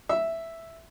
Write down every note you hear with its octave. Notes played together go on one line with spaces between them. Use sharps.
E5